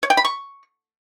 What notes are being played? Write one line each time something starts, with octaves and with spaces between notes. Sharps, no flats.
C#5
G5
B5
C#6